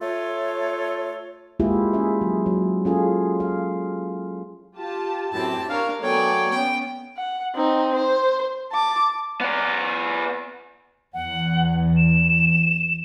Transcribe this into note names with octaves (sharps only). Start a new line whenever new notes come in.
A3 F4 A4 C#5
G#3 A#3 E4 F4 G4 G#4
C#4 G#4 E5
F#3
F#3
C#4 F4 G#4 A4
F5
F4 G4 A5
F#2 A2 C4 E4 G4 A5
D4 A#4 C#5 F5
F#3 A3 B3 C#5 D5 G5 G#5
B3 C#4 G5
F#5
C4 D#4
C5
A5 D6
B3 D5
E2 F#5
E7